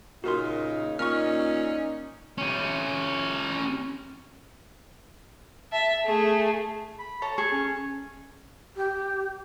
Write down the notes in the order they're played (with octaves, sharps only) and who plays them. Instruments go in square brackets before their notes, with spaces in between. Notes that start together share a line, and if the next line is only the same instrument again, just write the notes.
[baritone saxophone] A#2 [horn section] C#3 D#4 [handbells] F#4 A#4 C6
[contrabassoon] A#2 [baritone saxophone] C#4 [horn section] D#4 [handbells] C#6 F6
[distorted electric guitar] C#4 G4
[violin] E5 A5
A3 G#4
[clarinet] B5
[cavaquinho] A4 C#5 A#5 [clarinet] A5
[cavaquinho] G#4 A4 [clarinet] C#6
[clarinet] C#4
[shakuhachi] G4